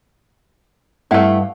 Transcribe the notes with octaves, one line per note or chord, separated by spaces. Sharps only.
G2 A3 E4 F5 F#5